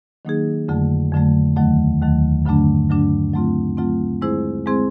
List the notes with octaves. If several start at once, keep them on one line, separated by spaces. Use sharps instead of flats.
D#3 F#3 A#3 D#4 G#4
F2 D3 F#3 A3
F2 D3 F#3 A3
D#2 D#3 F#3 A3
D#2 D#3 F#3 A3
G2 D3 F#3 A3 D4
G2 D3 F#3 A3 D4
F#3 A3 C4 F4
F#3 A3 C4 F4
G#3 C4 E4 G#4 C5
G#3 C4 E4 G#4 C5